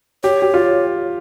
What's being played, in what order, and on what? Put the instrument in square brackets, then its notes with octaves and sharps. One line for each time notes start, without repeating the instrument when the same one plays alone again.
[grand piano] G4 [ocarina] C#5
[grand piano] G4
F4